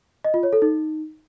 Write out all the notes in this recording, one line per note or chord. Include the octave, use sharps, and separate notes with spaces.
D#5
F4
C#5
A4
D#4